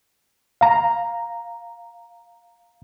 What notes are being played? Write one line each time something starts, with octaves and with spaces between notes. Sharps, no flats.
F5 A#5